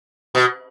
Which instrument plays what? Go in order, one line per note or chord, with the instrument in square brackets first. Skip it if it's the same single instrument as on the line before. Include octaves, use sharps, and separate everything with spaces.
[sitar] B2